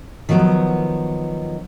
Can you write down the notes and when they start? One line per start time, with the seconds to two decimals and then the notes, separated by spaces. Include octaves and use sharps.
0.29 D#3 F3 F#3 B3